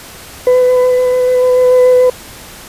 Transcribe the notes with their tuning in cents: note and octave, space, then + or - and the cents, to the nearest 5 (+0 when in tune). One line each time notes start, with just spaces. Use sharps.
B4 +30